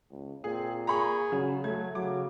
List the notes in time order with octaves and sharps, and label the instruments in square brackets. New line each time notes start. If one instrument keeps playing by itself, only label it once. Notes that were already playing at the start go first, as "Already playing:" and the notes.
[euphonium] C#2
[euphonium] A#2 [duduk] C4 [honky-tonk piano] G#4
[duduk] G#4 [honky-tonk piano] A#5 B5 C#6
[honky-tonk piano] C#3 [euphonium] F#3
[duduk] F#3 [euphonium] A3 [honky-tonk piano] G#6
[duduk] C#3 [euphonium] F#3 [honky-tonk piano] D6